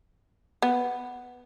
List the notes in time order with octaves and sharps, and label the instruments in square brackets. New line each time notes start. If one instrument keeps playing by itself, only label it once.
[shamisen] B3